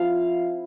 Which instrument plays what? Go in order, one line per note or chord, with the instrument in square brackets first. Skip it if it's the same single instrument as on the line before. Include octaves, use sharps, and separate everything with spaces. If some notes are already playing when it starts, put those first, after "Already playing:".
Already playing: [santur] F3 C4 E4 F5